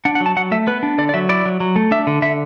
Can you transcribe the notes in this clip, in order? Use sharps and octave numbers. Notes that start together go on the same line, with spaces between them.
D4 F#5
F#5
F#3
A5
F#3 F#5
A3 E5
B3 B4
D4
D3 D5
D5
F#3 E5
E4 D5
F#3
F#3
A3
D4 E5
D3
D3 E5